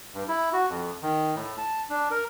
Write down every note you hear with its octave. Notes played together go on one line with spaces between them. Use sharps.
G2
E4
F#4
F2
D#3
A2
A5
D4
A#4